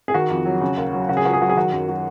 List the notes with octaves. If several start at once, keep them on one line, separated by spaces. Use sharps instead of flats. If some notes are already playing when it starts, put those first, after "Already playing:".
G#4
D#3 F#4
F2
F#3
C#3
D#2
F#3
C#3 F#4
G#4
C#2 F#4
G#4
F#3 F#4
G#4
D#3 F#4
F#2
F#3